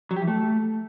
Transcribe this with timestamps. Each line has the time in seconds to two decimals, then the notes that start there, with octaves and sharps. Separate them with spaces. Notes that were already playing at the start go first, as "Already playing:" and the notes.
0.11 F#3
0.16 G4
0.22 E3
0.27 A3